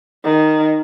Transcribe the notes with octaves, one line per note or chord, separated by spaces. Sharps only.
D#3